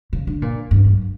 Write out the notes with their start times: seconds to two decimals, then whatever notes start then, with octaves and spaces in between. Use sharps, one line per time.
0.13 C#3
0.27 D3
0.42 A#2
0.71 G2
0.86 F#2